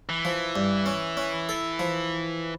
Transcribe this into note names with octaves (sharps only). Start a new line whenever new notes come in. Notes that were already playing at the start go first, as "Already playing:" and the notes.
E3
F3
G2
C#4
C#4
A4
F3